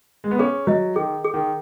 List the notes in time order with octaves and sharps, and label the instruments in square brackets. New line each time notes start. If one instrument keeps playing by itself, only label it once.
[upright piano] G#3
B3
[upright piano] C#4 [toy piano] G#4
[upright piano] F#3 [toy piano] D#5
[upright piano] D#3 [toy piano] G#4
[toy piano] G#4
[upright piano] D#3